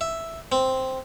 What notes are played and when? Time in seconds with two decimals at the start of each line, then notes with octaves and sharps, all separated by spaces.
0.01 E5
0.52 C4